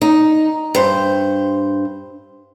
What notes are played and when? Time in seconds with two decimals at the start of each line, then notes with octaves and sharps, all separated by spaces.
0.02 D#4
0.75 G2 C5